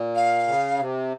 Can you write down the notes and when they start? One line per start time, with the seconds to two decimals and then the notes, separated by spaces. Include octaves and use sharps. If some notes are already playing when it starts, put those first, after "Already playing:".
Already playing: A#2
0.16 F5
0.47 C#3
0.79 C3